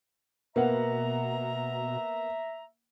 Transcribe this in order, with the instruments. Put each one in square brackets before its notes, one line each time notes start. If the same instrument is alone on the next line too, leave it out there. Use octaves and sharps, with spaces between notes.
[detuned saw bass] B2 [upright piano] A#3 B3 F#5 [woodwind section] E5 A#5